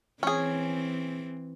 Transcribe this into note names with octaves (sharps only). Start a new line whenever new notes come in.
E3 C4 C#4 G#4